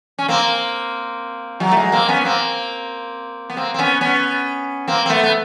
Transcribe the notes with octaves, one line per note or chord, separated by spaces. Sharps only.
C#4
A#3 C4
F#3 G#3
A3
F#3 G#3
A#3 C4
B3 C#4
B3
A#3 C4
B3
A#3 C4
C4
B3 C#4
B3 C#4
A#3 C4
C4
A3 B3
B3